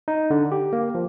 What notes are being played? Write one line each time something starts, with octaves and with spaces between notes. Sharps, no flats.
D#4
D3
G4
A#3
F3